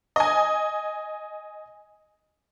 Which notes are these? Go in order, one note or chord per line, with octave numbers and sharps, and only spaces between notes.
D#5 G#5